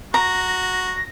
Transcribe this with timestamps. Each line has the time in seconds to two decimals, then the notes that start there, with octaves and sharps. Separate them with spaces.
0.14 F#4 A#5 A#6